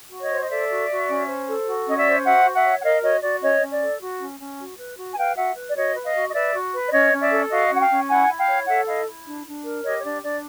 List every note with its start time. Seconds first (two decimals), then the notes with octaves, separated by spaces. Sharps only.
0.11 F#4
0.21 C#5 D#5
0.30 C5
0.41 D#5
0.50 A4 D5 E5
0.70 F#4
0.89 F#4
1.09 C#4
1.27 C5
1.47 A4
1.67 F#4
1.87 C#4 D#5
1.96 D5 E5
2.06 C5
2.25 F#4 E5 F#5
2.45 F#4
2.54 E5 F#5
2.64 C#5
2.79 F#5
2.83 A#4 D#5 F5
3.03 F#4 C#5 D#5
3.23 F#4 D5
3.42 C#4 C#5 D#5
3.61 C#4
3.71 D5
3.81 A4
4.00 F#4
4.20 C#4
4.40 C#4
4.59 F#4
4.78 B4
4.97 F#4
5.13 G#5
5.17 B4 F5 G5
5.36 F#4 E5 F#5
5.56 B4
5.66 D5
5.75 F#4 C#5 D#5
5.95 B4
6.05 D#5 F5
6.14 F#4
6.28 D#5
6.34 B4 D5 E5
6.53 F#4
6.73 B4
6.87 D5
6.92 C#4 C#5 D#5
7.11 C#4
7.21 D5 E5
7.31 A4
7.50 F#4 D#5 F5
7.69 C#4
7.76 F#5
7.79 F5 G5
7.90 C#4
8.09 E4 F#5 G#5
8.28 E4
8.38 F5 G5
8.47 C#5
8.67 A4 E5 F#5
8.86 E4 D#5 F5
9.06 E4
9.26 D4
9.45 D4
9.64 A#4
9.84 G4 C#5 D#5
9.98 C#5
10.03 D4 D5
10.23 D4 D5